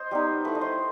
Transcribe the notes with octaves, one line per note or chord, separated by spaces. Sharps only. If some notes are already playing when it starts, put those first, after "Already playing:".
Already playing: C5 D#5
G3 B3 D#4
A3 E4 B4
D#5
C5